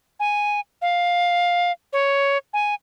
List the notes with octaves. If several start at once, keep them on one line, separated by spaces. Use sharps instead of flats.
G#5
F5
C#5
G#5